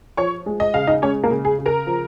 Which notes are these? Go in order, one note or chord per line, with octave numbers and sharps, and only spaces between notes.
F3 C#5 C#6
G#3
D#5
C#3 F5
D#4 D#5
G#3 C#4 C#5
A#3 A#4
C#3
G#4
C#3
A#4 A#5
F3